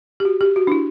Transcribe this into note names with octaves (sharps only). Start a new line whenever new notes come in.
G4
F#4
G4
F#4
D4
E4